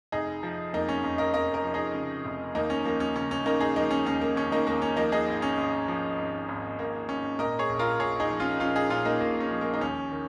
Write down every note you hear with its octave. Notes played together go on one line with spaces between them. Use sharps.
F1 D#4 G#4
F3
F2 A#3 D#4
C#4
F2
A#4 D#5
F2 A#4 D#5
A#4 D#5
F3
D#4 G#4
C#3
F1
D#2 A#3 D#4
C#4
F3 A#3
C#4
C#3 C#4
C#4
C#3 A#3 D#4
D#4 G#4
F3 A#3 D#4
C#4
D#2 C#4
A#3
D#2 C#4
A#3 D#4
D#2 A#3
C#4
F3 A#3 D#4
D#4 G#4
G#1
C#4
G#1
F3
G#1
G#1
G#1 A#3
G#1 C#4
A#2 A#4 D#5
G#4 C#5
A#1
F4 A#4
A#1 G#4 C#5
D#4 G#4
F3
C#4 F4
A#1 C#4 F4
D#4 G#4
A#2 C#4 F4
A#3 D#4
A#1 A#3
C#4
F3
A#3
D#4
D#2 C#4
D#3